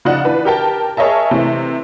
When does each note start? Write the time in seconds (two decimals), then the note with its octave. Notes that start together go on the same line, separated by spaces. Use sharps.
0.05 C#3 F3 D#4 D5 F#5
0.24 E3 D4 B4 D5
0.45 G4 A#4 G5 A5
0.97 G#4 A#4 C#5 D#5 E5 A5
1.31 C3 E3 A3